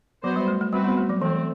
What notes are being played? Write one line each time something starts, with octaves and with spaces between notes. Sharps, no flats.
F#3 B3 F#4 C5
G3
A3
A3
G3 C4 F#4 B4
B3
A3
F#3
E3 A3 C4